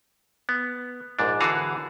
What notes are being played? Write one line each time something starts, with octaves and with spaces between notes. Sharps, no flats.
B3
A#1 G#2 D4
D3 E3 F#4 G#4 F5